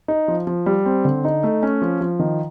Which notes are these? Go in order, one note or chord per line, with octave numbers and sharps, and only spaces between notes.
D#4
F3
F3
G3
C4
D3
D#4
A3
C#4
F3
F3
D#3